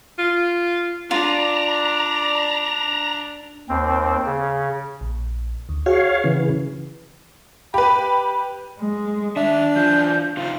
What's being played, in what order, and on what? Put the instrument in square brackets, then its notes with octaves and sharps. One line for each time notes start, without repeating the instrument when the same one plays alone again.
[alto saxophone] F4
[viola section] D4 [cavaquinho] F4 [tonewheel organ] A#5
[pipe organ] D#2 C4
C#3
[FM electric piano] A#1
D2
[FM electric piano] F#4 G#4 [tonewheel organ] C#5 F5
[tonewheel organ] C#3 E3
[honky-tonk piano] G4 B4 [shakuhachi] B5
[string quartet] G#3
[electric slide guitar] D#3 E5 [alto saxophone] D4
[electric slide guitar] E3 F4 [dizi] G6
[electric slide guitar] C#3 D#4 F4 [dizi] F5